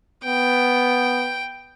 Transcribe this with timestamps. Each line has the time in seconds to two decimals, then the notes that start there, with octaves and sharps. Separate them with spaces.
0.25 B3 G5